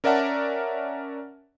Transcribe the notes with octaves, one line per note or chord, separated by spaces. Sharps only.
C#4 A#4 D5 E5 F#5 A5